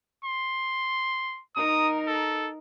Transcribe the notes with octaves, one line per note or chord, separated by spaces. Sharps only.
C6
D#4 A#4 D#6
A4